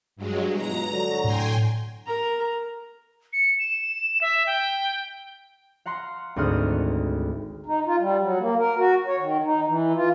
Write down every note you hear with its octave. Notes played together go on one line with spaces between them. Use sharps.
G2 F#3 G#3
B2 E3 F4 A#5 A#6
D3 F#3
A2 G5 G#5 C6
A#4 A#5
C#7
E7
E5
G5
F5 F#5 A#5 C6
G#1 D2 C4 F#5 D#6 F6
D#4
F4
G3
F#3
A#3
A#4
F#4
C#5
D#3
D#4
E3
F4